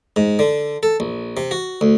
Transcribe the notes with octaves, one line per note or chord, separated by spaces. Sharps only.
G#2
D3
A4
A#1
C3
F#4
D2